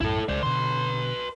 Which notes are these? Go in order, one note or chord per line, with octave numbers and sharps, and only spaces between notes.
B1 F#2 A2 E4 A4
C#2 G#3 C5 D5
B2 D3 B4 C6